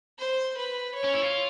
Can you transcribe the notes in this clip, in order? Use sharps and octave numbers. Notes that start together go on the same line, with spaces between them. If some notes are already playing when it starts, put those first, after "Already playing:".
C5
B4
C#5
C#4
E4
F4